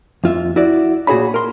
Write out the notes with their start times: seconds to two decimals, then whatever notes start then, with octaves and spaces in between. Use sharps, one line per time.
0.24 F2 F4 E5
0.56 E4 F#4 D5
1.07 A#2 F#4 G#4 C#5 B5
1.34 A#4 C6